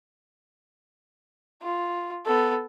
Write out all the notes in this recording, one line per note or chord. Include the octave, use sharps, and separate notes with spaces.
F4
B3 A4